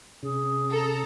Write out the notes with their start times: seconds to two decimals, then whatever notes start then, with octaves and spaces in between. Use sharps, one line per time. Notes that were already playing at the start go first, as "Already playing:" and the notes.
0.23 C3 C#4 G#4
0.70 A4 A#5